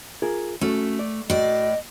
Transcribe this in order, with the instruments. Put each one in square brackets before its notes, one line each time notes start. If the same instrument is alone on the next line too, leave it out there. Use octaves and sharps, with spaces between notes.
[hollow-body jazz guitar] F4 G#4 A#4
[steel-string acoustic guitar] A3 [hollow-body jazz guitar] C#4 F#4 A4
[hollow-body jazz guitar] D5
[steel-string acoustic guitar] A2 D5 [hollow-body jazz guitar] F#4 [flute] D#5